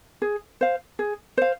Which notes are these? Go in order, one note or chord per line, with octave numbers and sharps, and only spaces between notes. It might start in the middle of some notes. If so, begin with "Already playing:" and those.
G#4
C5 F5
G#4
C5 F5